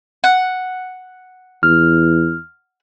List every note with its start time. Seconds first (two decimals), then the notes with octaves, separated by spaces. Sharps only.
0.24 F#5
1.63 E2 F6